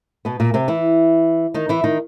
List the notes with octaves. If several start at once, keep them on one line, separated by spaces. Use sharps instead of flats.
B2 B3
A#2 A#3
C3 C4
E3 E4
D#3 D#4
E3 E4
D#3 D#4